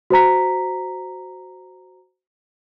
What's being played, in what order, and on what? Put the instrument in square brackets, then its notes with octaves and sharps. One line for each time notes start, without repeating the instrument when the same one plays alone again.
[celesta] F#4 C5 A#5 B6